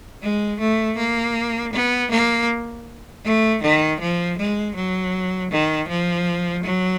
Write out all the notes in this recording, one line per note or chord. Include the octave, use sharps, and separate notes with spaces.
G#3
A3
A#3
B3
A#3
A3
D#3
F3
G#3
F#3
D#3
F3
F#3